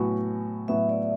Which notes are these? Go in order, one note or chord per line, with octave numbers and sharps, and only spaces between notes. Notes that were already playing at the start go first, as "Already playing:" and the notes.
Already playing: A2 F#3 B3 F#4 G#5
A2 F#3 B3 F#4 E5
D5